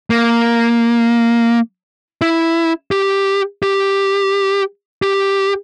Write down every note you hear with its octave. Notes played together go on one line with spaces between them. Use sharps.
A#3
E4
G4
G4
G4